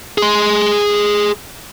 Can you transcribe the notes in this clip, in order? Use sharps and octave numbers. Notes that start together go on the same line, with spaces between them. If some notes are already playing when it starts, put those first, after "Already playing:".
G#4 C6